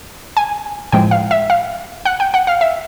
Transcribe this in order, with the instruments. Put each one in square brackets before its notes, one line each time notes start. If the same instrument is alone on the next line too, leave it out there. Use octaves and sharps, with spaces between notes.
[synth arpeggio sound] G#5
A2 F3 G#3 G5
F5
E5
F5
F#5
G5
F#5
F5
E5